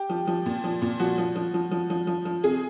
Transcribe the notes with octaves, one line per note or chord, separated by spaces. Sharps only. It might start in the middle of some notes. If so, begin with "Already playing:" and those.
Already playing: G4
F3
F3
A#2
F3
A#2
F3 F#4
F3
F3
F3
F3
F3
F3
F3
C3 G#4